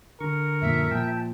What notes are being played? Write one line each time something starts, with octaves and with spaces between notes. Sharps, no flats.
D3 A#4 C#6
F#2 A#2 F3 E5
A#2 F3 G5 A5